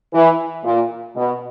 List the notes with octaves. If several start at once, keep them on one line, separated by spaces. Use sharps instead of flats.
E3
A#2
B2